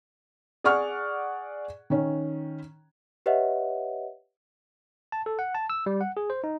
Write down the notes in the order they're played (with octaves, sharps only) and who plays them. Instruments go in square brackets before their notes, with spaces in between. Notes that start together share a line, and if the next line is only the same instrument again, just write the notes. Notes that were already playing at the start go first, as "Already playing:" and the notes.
[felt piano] G#4 D5 F#5 C#6 F6
D#3 C#4
[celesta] G4 B4 C#5 D#5 E5 F#5
[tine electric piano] A5
A4
F#5
A5
E6
G3
F#5
G#4
C5
D#4